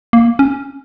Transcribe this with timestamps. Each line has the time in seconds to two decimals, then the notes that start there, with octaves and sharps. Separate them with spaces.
0.13 A#3
0.39 C#4